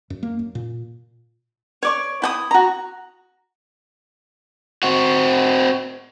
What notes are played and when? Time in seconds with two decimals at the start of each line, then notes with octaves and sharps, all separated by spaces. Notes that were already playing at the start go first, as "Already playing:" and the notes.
0.10 F#2
0.23 A#3
0.39 F#2
0.55 A#2
1.83 C#5 D5 C#6
2.22 E4 G5 D#6
2.51 F#4 A#5
4.83 C4 F#4